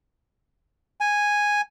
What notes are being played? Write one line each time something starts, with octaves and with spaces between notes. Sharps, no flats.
G#5